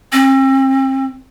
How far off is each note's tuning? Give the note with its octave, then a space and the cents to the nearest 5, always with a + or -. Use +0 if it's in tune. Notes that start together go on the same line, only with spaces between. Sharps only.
C4 +40